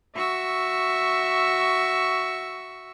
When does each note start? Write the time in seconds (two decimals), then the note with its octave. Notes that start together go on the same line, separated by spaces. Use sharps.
0.15 F#4 E5 C#6 E6